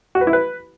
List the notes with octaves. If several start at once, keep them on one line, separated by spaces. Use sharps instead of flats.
F#4
B4
E4
B4